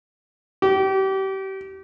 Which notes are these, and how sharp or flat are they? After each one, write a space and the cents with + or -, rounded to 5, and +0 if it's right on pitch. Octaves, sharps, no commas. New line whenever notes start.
G4 -30